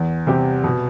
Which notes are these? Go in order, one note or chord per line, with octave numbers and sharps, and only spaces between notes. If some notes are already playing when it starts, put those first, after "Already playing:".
Already playing: E2
C3 G3 C4 G4
B2